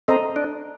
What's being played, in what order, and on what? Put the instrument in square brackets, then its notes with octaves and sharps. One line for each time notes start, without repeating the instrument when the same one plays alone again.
[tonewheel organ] C4 [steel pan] A4 D#5 A#5
[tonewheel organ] D4